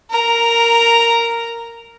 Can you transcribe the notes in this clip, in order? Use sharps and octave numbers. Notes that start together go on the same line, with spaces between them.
A#4 A#5